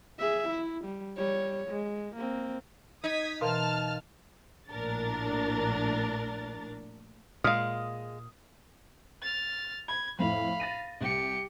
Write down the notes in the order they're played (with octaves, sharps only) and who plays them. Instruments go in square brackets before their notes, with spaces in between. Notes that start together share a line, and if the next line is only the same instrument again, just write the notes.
[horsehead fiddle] G#4 E5
E4
G3
G3 C#5
G#3
A#3 C4
[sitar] D#4 [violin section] D#6 G#6 B6
[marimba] B2 E3 [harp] A#4 C5 F5 [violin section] A5 F6
[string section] A#1 A2 D4 A#4 A6
[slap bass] A#2 [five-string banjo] G#3 F5 [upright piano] D#6 F6
[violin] F6 A6
[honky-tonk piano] B5 [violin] G#6
[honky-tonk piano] F2 A2 [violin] F5 B5
[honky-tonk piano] A6 A#6 D#7
[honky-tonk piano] C2 [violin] G4 C#7